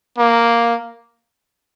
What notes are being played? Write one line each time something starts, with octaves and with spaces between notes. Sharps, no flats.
A#3